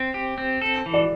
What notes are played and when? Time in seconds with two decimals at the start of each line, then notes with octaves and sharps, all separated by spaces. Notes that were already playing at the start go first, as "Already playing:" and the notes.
Already playing: C4
0.14 G4
0.38 C4
0.62 A4
0.86 E3
0.94 D5